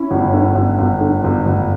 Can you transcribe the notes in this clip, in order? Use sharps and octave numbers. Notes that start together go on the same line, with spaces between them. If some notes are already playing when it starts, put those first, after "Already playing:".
Already playing: C#4 E4
G1
D3
G1
G1
D3
G1
G1